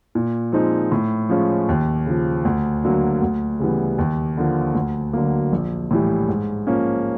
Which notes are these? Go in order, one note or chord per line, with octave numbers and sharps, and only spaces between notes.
A#2
F3 G#3 C4 D#4
A2
F3 G#3 C#4 F4
D#2
C#3 F3
D2
D3 F#3 A#3
D2
C#3 E3 G3 B3
D#2
D3 F3 A#3
D2
D3 F#3 A#3
A#1
A2 E3 G3
G#2
F3 A#3 C#4